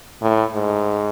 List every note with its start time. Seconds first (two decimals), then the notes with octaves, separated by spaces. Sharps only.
0.21 A2
0.53 G#2